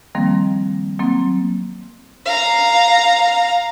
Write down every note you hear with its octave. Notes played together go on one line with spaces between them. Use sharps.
D#3 F3 G3 A#3 C4
F#3 A#3 C4
F5 A#5